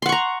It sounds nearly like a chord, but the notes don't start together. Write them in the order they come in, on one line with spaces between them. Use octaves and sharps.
C6 F#5 C#6 A#5